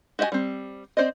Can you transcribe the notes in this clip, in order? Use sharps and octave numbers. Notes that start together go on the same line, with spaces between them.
F#4 G4 D#5 E5 G#5
G3 C4
C4 A4 C5 D5 D#5